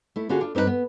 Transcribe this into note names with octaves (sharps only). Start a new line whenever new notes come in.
A3 E4
D3 C#4 F4 F#4 G#4
D4 F4
G2 C4 D#4 F4 B4
B3